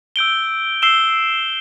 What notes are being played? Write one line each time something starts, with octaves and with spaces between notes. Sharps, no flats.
E6 G6 D7 G7
E6 C7 E7 G7